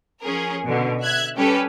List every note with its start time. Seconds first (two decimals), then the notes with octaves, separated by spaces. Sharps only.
0.22 F3 C#4 G#4 A#4
0.64 B2 D3
1.03 E5 F#6 G#6
1.37 G3 C#4 G4 A4 B4